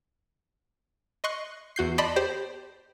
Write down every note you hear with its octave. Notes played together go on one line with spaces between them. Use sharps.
D#5 C6 C#6 F#6
E2 F#4 G6 C7
D5 D#5 A5 B5 C6
G4 C5